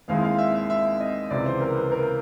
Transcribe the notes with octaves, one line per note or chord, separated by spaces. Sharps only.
D#2 D#3 G#3 C4 E4 F5
F5
E5
E5
E5
D#5
C#2 C3 E3 D5
C5
A#4
B4
A#4